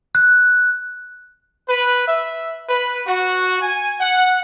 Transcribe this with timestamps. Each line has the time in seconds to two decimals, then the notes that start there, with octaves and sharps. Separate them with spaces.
0.15 F#6
1.69 B4
2.08 E5
2.69 B4
3.07 F#4
3.62 G#5
4.00 F#5